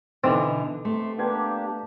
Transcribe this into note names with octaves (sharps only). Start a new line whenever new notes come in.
B2 D3 E3 B3 C4 D#4 D6
C3 A3 C6
A#3 B3 D4 G4 G#6